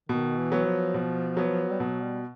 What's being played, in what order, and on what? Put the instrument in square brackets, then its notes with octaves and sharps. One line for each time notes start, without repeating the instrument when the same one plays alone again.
[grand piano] B2 [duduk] D#3
[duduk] E3
[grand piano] F#3 B3
[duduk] F3
[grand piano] B2
F#3 B3
[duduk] G3
[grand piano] B2 [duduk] F#3
[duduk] G3